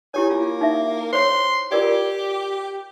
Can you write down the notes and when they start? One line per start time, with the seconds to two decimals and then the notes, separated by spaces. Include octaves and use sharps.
0.14 E4 G4 C#5 G#5
0.30 A#3 F4
0.61 D#4 E5
1.13 C5 C#5 C6
1.72 F4 G4 A#4 D5